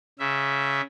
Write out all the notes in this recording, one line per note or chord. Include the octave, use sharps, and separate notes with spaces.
C#3 E5